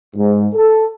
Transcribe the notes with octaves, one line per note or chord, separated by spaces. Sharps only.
G#2
A4